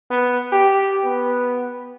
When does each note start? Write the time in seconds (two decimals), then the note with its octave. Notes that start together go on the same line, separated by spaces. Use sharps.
0.11 B3
0.52 G4
1.04 B3